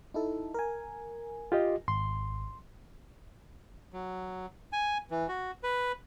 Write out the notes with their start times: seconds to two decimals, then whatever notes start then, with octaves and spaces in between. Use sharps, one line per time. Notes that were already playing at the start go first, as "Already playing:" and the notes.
0.14 D#4 E4 A4
0.54 A#4 G#5
1.52 F4 G4 D#5
1.88 G#1 C6
3.93 F#3
4.72 G#5
5.11 E3
5.28 F#4
5.63 B4